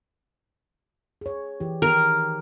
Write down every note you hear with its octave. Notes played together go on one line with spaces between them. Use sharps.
G#4 C#5
E3 G4
D#3 G4 A#4